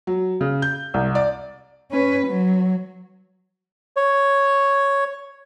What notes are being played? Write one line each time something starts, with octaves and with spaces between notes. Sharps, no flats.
F#3
C#3
G6
C2
D5
C#4 B4
F#3
C#5